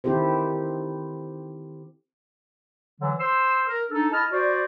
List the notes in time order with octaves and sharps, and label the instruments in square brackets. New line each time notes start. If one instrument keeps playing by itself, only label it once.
[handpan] D#3 C4 E4 G4 A4 C5
[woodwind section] D3 E3 F#3
C5 C6 E6
A#4
D4 D#4 A4
E4 D#5 A5 F6
F#4 C5 D5